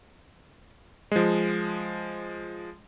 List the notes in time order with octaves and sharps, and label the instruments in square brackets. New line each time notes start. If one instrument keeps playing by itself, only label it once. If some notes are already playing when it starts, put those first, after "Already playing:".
[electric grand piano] F3 G#3